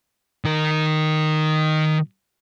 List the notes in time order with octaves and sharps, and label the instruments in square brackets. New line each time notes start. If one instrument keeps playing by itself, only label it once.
[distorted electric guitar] D#3 A#4